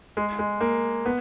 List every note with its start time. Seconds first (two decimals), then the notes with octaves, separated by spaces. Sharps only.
0.17 G#3
0.39 G#3
0.61 A#3
1.06 B3